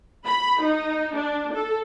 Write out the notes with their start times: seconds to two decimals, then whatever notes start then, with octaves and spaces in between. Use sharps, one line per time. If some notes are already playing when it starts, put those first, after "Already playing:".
0.25 B5
0.61 D#4
1.14 D4
1.53 A4